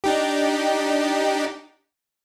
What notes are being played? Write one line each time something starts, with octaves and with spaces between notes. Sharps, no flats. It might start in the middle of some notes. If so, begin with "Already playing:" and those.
D4 D#4 G4